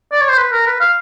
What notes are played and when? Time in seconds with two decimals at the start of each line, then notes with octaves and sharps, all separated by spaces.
0.12 D5
0.21 C#5
0.29 C5
0.37 B4
0.52 A#4
0.66 B4
0.80 F5